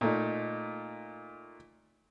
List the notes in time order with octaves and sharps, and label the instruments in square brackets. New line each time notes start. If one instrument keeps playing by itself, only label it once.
[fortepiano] A#2 A3 D#4